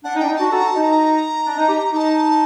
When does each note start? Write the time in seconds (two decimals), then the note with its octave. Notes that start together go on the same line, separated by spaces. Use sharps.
0.04 D4 F#5
0.16 D#4
0.20 D4 G5
0.28 D#4
0.35 D4 F#4 A5
0.52 F#4 A4 A#5
0.67 A5
0.75 D#4
0.83 A#5
1.46 D4
1.57 D#4
1.69 D#4 G4
1.93 D#4 A5 A#5